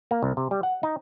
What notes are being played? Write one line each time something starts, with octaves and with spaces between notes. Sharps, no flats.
A#3
C2
C3
G3
F#5
D#4